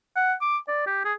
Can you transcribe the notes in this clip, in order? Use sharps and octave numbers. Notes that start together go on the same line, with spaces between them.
F#5
D6
D5
G4
G#4